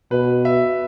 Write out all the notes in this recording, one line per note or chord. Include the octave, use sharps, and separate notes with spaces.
B2 B4
E5